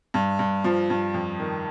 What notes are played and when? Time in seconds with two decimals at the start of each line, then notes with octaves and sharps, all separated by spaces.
0.14 G2
0.39 G2
0.64 F3
0.90 G2
1.14 F2
1.40 D#3